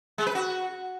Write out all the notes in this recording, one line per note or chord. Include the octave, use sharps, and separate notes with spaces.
G#3
B4
F#4